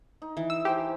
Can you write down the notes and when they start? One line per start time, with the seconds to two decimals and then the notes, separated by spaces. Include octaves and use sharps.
0.22 D#4
0.37 E3
0.50 E6
0.65 G4 G#4 C5 G5